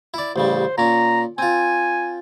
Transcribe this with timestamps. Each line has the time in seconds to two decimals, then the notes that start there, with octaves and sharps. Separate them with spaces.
0.14 E4 D5
0.36 A1 C#3 G3 C5
0.78 A#2 C#4 A#5
1.38 C4 F4 G#5